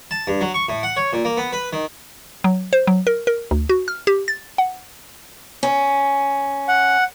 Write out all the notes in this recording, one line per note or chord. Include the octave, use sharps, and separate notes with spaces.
A5
G2
F#3
C#6
A2
F#5
C#5
A#2
A#3
B3
B4
D#3
F#3
C5
F#3
A#4
A#4
D2
F#4
F6
G4
A6
F#5
C#4
F#5